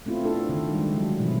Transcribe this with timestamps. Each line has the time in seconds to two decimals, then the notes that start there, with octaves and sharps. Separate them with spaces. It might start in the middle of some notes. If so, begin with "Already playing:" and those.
0.06 A3 B3 C4 E4 F4
0.24 D4 A4
0.49 D3 D#3
0.72 G3 G#3
0.94 D3 F#3
1.20 B2 E3 F3 G3 E4